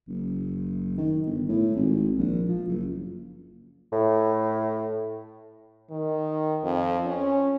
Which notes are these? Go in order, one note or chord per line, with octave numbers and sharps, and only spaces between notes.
F#1
D#3
G1
A2
G#1
A#1
F3
F#1
A2
D#3
F2
C#4